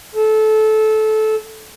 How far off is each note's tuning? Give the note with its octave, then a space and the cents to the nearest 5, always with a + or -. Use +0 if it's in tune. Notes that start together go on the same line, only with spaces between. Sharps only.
A4 -20